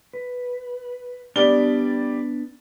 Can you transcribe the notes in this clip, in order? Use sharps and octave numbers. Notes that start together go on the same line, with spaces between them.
B4
G3 B3 D4 D5 G7